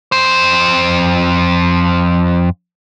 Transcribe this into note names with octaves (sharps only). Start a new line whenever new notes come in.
F2 C5